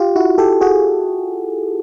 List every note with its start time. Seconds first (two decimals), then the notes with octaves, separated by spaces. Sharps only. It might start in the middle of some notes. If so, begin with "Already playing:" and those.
Already playing: F4 G4
0.16 E4 F#4
0.38 G4 A4
0.61 F#4 G#4